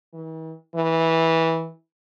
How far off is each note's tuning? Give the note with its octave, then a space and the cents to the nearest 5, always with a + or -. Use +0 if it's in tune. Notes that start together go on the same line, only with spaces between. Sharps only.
E3 -45
E3 -15